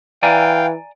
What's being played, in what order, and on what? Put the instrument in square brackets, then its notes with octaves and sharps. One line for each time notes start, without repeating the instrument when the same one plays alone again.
[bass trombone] E3 [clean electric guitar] D5 G#5 A#5 [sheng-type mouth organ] F5 G5